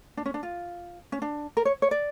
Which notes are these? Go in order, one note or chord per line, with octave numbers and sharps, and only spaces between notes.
D4
C#4
D4
F4
C#4
D4
A#4
C#5
C#5
D5